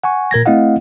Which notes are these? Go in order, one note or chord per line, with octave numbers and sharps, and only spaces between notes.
F#5 G#5 C#6
A#2 A#4 G#6 A#6
A3 C4 E4 D#5 F5 F#5